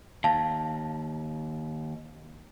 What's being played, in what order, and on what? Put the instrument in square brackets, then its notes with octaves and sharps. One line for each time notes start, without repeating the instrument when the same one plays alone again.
[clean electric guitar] D#2 [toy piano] F5 A5